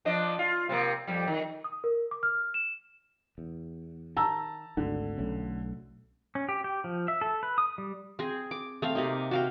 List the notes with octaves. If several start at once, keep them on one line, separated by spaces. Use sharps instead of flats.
F3 D4 D#5
F4
C3 A#3
F2 G3
D#3
D#6
A#4
D6
F6
E7
E2
D#3 A5 A#5 E6
G#1 D2 D3
B1 A3 C#4
C#4
G4
G4
F3
E5
A4
B4
D#6
G3
C4 G#4
D6
A3 C4 F5
C3 A#3 D#4
F#4 F5 G5